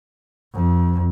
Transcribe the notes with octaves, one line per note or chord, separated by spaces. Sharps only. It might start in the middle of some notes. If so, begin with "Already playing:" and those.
F2